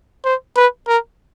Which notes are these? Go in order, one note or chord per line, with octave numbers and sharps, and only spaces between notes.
C5
B4
A#4